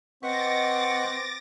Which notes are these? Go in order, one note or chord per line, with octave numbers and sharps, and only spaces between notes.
C4 B4 D#5 F#5 C#6 D6 A6 A#6